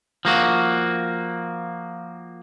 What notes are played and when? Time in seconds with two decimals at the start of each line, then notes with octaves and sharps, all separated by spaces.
0.25 F3 A#3 F#4